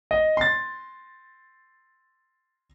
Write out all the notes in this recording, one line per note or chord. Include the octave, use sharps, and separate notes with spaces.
D#5
C6 A6